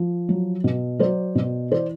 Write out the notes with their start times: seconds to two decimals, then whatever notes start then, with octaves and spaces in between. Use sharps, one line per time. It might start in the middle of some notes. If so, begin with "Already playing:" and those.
Already playing: F3
0.29 F#3
0.64 B2
0.99 F#3 C5 D5
1.35 B2
1.71 E3 C5 D5